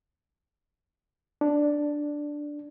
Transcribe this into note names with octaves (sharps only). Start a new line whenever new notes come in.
D4